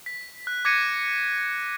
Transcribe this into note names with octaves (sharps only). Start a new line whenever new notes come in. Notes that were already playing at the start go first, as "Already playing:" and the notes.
B6
F#6
D6 G#6 A#6 C#7 D#7